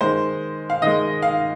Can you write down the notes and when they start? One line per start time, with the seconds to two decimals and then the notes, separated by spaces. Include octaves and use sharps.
0.01 D#3 G#3 C5
0.70 F5
0.82 D#3 G#3 D#5
1.22 F5